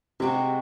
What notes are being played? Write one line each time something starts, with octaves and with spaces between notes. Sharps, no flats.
C3 G#3 C4 F#4